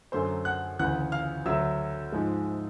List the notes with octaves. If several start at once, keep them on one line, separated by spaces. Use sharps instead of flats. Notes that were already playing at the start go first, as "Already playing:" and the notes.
F#2 D3 F#3 A3 C5 C6
F#5 F#6
D2 C#3 E3 F#5 F#6
F5 F6
D2 D3 F#3 E5 E6
G#2 F3 G#3